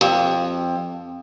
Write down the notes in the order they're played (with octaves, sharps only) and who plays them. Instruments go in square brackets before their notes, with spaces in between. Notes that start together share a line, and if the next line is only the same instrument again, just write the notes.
[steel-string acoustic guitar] F2